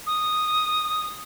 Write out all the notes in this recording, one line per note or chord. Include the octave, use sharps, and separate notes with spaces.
D#6